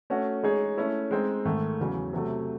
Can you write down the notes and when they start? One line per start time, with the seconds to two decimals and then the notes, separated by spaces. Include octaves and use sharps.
0.10 A3 C#4 F#4
0.43 G#3 D#4 G#4 C#5
0.77 A3 C#4 E4
1.11 G#3 C4 D#4
1.45 G#2 D#3 A3
1.80 E2 C#3 F#3
2.13 C3 F#3 A3